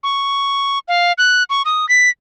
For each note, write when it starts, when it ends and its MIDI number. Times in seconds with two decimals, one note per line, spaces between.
0.03 0.79 85
0.88 1.13 77
1.18 1.43 90
1.50 1.62 85
1.65 1.88 87
1.89 2.10 95